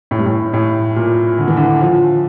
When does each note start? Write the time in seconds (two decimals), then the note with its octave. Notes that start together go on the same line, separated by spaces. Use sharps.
0.11 A2
0.18 G2
0.26 A2
0.53 A2
0.96 A#2
1.38 D3
1.48 E3
1.57 D3
1.81 F3